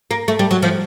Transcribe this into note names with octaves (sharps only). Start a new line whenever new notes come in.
A#3
A3
G3
F#3
F3